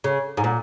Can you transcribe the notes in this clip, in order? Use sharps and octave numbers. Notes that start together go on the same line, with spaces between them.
C#3
G#2
A#2